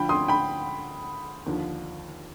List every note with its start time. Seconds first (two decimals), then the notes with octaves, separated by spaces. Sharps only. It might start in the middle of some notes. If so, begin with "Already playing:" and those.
Already playing: D2 D3 F3 G5 B5
0.09 C6 D#6
0.28 G5 B5
1.46 D#2 D3 F3